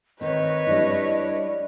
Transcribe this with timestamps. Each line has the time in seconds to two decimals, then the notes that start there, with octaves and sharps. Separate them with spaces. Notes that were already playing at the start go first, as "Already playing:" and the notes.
0.21 D#3 C4 B4 C#5 D#5
0.67 G3 D4 E4